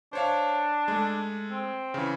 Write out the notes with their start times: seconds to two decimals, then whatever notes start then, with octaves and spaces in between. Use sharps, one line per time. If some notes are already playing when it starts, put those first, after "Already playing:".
0.13 D4 C5 C#5 F5
0.88 G#3 A3
1.50 C4
1.94 C#3 E3